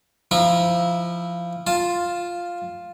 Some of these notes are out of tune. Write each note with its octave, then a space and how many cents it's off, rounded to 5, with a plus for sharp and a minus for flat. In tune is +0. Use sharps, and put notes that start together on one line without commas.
F3 -15 E4 -5 A#5 +25
F4 +0 A5 +0